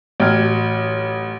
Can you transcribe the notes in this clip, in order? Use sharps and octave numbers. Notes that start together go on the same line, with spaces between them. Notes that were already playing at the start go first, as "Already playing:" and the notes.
A1 F#3 G5 F6 G#6